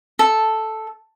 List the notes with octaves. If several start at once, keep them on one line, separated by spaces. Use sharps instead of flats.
A4